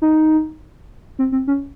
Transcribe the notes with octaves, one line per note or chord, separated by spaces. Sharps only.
D#4
C4
C4
C#4